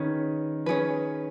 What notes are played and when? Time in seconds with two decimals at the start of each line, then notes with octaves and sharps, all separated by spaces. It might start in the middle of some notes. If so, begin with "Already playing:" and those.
Already playing: D#3 C#4 G#4 B4
0.66 C#4 G#4 B4